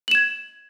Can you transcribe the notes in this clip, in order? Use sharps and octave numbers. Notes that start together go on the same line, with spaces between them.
G#6 E7 F#7